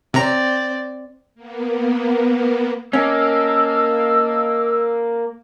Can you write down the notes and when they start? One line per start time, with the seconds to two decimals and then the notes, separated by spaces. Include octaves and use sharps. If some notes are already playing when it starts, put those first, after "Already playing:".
0.14 C3 C4 D5 A#5
1.35 A#3 B3
2.93 A#3 C#4 D#5 A5 E6